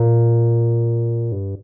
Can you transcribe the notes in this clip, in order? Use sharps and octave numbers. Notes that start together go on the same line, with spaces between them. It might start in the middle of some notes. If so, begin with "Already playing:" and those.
Already playing: A#2
G2